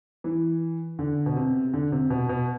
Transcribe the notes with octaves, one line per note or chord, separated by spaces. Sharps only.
E3
D3
B2
C3
D3
C3
B2
B2